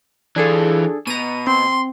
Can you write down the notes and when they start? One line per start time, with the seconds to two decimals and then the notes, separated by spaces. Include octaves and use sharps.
0.36 E3 D4 F4 G#4 A4
1.07 B2 A#5 D#7
1.47 C4 C6